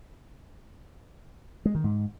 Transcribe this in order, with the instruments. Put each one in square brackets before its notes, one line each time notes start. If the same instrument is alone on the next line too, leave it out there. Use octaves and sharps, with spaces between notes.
[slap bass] G#3
D#3
G#2